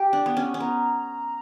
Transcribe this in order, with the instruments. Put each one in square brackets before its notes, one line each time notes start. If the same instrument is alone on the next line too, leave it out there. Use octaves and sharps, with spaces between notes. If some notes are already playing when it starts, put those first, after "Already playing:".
Already playing: [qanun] G4 [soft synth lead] G5
[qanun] D4
B3
C#4
C#4
[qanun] B3 [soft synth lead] A#5